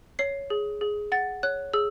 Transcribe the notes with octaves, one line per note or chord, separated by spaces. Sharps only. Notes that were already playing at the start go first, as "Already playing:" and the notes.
C#5 C7
G#4
G#4
F#5 A6
C#5 F#6
G#4 E6